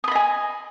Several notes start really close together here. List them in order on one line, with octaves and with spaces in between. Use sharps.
D#6 B5 D#5 G#5